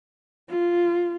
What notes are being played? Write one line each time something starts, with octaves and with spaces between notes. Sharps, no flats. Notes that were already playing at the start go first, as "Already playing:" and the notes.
F4